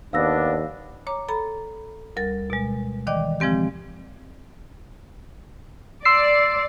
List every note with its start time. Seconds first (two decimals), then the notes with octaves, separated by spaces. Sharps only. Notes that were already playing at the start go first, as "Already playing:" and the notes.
0.13 D#2 B3 D4 F5 E6 A#6
1.07 C#5 A#5 D6
1.29 A4 A#5 B5
2.17 D2 G3 A#4 A6
2.50 B2 G#3
3.07 D#3 E3 D5 D#5 G5 D6
3.40 C#3 F3 G#3 C4 G4
6.05 D5 C6 E6 C7